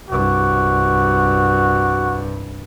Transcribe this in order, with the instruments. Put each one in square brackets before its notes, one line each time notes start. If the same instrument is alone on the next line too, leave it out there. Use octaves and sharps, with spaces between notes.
[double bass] C2 G2 [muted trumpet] F#4